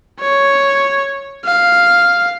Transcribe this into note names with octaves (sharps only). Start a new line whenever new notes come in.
C#5
F5